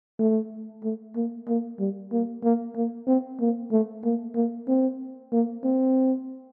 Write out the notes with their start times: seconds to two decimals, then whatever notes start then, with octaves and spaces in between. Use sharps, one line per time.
0.19 A3
0.83 A3
1.16 A#3
1.48 A#3
1.79 G3
2.12 A#3
2.43 A#3
2.76 A#3
3.07 C4
3.40 A#3
3.71 A3
4.04 A#3
4.35 A#3
4.68 C4
5.32 A#3
5.64 C4